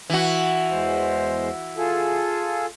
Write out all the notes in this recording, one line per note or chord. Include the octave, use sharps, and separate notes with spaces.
E3 F#4
E2 G#3 C5
F4 G#4 A4